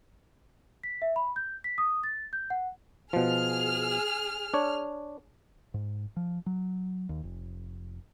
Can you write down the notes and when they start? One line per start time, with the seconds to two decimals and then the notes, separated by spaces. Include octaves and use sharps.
0.83 B6
1.02 E5
1.16 B5
1.36 G6
1.64 B6
1.78 D#6
2.04 A6
2.33 G6
2.50 F#5
3.13 B2 F3 G#4 F6
4.54 D4 C#5
5.74 G#2
6.16 F3
6.46 F#3
7.09 D#2
7.24 F1